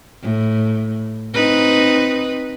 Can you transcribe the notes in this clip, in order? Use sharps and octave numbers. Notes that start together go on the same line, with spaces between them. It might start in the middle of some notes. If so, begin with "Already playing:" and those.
A2
C4 D#4 B4